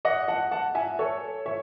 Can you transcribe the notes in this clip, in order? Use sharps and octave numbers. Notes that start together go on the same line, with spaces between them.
D#5 F#5
F#5 A5
F#5 A5
E5 G#5
A4 C#5
C#5 E5